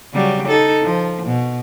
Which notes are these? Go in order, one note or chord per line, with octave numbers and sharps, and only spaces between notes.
C#3 F#3 G3
D#4 A4
F3
B2